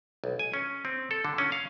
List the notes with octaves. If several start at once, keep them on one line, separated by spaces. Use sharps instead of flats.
B1
G#5
C#4
C4
A4
D3
C#4
F5